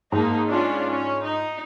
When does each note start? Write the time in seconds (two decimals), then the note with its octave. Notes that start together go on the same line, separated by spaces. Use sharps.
0.12 G#2 A#3 D#4 A5
0.49 C#4 D4 F4
0.87 C#4
1.24 D#4